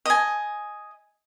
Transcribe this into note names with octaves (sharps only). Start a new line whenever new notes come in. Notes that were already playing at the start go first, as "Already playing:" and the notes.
D#5 G#5